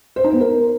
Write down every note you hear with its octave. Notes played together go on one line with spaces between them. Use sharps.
C5
D#4
B3
A#4